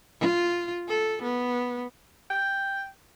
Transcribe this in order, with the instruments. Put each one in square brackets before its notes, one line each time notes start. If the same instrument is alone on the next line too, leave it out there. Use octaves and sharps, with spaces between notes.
[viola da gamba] F4
A4
B3
[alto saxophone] G5